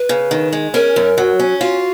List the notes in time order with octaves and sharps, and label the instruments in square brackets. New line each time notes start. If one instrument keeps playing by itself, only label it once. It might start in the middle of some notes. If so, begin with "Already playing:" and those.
Already playing: [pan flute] B4
[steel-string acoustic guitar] C#3
D#3
G#3
[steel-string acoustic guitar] C#4 [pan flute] A#4
[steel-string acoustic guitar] F#2
F#3
C#4
[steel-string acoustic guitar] F4 [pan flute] F#4